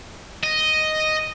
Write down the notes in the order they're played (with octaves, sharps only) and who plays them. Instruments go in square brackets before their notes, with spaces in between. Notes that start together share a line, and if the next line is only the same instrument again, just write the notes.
[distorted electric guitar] D#5